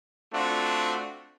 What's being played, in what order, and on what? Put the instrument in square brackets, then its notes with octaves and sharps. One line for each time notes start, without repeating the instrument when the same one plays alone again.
[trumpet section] A3 C4 D4 F4 F#4